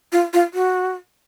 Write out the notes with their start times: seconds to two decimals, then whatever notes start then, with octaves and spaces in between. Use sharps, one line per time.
0.13 F4
0.34 F4
0.54 F#4